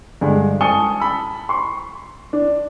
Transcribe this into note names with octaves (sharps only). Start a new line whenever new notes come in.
G2 D3 G#3
G#5 A5 C#6 D#6 C#7 G7
A5 B5 E6
C6 C#6
D4